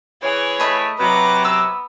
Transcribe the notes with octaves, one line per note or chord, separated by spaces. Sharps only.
E3 G#4 C#5
A3 D#5 B5
C3 F#3 B4 A#5 D6
B3 E6